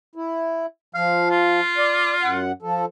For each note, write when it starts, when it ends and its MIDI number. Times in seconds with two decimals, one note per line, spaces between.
0.15 0.66 64
0.95 1.60 53
0.95 1.27 77
1.31 2.40 65
1.78 2.14 74
2.23 2.52 42
2.23 2.52 78
2.62 2.85 53
2.62 2.85 69